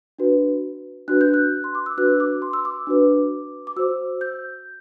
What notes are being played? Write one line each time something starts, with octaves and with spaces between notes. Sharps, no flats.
D4 F#4 B4
D4 F#4 B4 F#6
G6
F#6
C6
D6
E6
D4 F#4 B4 F#6
D6
C6
E6
D6
D4 F#4 B4
D6
F#4 C5 E6
G6